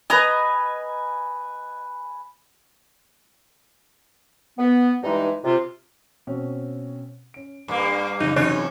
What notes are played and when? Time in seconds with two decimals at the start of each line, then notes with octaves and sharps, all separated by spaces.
0.10 B4 D#5 G#5 A#5 D#6
4.59 B3
5.03 G2 E3 G#3 D#4
5.44 C3 F4
6.27 B2 C4 C#4
7.34 C#4 D7
7.68 G2 A#3 D6
8.21 F#2 C#3 D#4
8.36 E2 C3 F#3 C#4 D#4 C#5